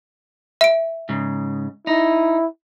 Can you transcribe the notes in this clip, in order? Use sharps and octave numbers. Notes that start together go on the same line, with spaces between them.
E5 D7
G#2 C#3
D#4 E4